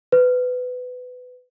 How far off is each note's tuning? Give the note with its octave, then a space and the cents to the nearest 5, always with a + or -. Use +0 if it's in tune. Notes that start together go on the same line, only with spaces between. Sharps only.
B4 +20